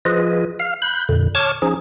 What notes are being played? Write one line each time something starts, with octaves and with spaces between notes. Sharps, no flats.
F3 F4 G#4 B4 D#5
F5 F6
B5 F#6 G6
F2 A#2 D3
C#5 A5 C#6 D6 F6
F3 C#4 D#4 G#4